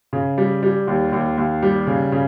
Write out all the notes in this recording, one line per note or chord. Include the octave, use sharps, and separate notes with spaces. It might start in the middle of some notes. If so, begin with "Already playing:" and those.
C#3
G3
G3
D#2
D#2
D#2
G3
C#3
C#3